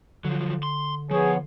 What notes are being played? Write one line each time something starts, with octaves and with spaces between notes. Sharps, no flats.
D3 F3 F#3
C6
F3 B3 G#4 C#5